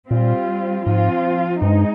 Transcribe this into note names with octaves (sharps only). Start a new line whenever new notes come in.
A#2 G3 C4 F4
G#2 F3 C4 F4
G2 G#3 D#4